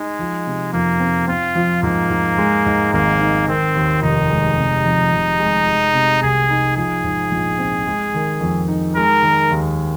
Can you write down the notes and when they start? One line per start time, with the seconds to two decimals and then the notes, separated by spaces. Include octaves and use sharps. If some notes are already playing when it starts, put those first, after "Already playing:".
Already playing: G#3 D#4
0.19 F3
0.47 C3
0.73 F2 A#3
1.00 C4
1.28 C4 F4
1.55 F3
1.83 G#2 A#3
2.10 G#2
2.38 G#3
2.66 G#2
2.93 G#1 A#3
3.21 D#4
3.48 D#3 C4
3.75 D#2
4.02 F1 D#4
4.29 G#3
4.58 C3
4.85 F2
5.13 F1
5.39 G#3
5.66 G#3
5.94 C3
6.22 C2 G#4
6.50 D#4
6.77 F3 G#4
7.04 G#2
7.31 A#1
7.59 C4
7.87 G#3
8.14 D#3
8.41 F2
8.68 D#4
8.96 G#3 A#4
9.23 D#3
9.51 D#2